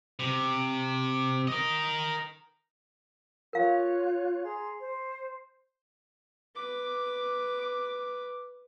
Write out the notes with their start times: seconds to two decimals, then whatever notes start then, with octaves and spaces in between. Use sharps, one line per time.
0.19 C3
1.48 A#4 D#5
3.53 F4 A#4 C#5 F5 F#6
4.43 G#4 A#5 C6
4.80 C5
6.55 B4 D6